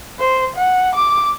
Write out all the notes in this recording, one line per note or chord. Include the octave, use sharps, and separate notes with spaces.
C5
F#5
D6